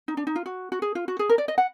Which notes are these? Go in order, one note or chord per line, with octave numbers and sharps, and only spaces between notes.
D#4
D4
D#4
F4
F#4
F#4
G#4
F4
F#4
G#4
A#4
D5
D#5
F#5